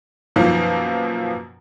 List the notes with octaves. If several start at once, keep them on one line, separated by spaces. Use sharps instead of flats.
F#2 B2 D#3 F3 A#3